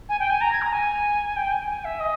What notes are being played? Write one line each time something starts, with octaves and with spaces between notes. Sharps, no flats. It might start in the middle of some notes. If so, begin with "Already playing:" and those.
G#5
G5
G#5
A#5
G#6
A#5
G#5
G5
G#5
G#5
E5
D#5